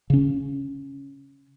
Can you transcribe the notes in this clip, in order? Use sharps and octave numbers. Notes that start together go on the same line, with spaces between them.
C#3 C#4